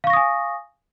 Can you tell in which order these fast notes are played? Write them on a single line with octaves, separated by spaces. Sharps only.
F5 C#6 A#6 D#6 G#5